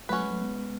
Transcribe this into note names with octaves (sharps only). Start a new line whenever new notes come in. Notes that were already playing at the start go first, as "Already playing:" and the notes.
F#3 A3 C#4 F#4 B4
G#3
F#3 A3
G#3 B3